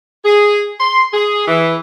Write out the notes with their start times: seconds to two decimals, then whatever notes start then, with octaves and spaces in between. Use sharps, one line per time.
0.25 G#4
0.80 C6
1.14 G#4
1.48 E3